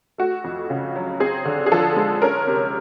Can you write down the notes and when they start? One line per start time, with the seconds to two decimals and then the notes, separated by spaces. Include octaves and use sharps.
0.18 A3 F#4
0.44 F2
0.70 C#3
0.96 F#3
1.20 C4 G#4
1.45 D3
1.66 G#4
1.72 F3 A4
1.96 G#3
2.22 C#4 A#4
2.47 C3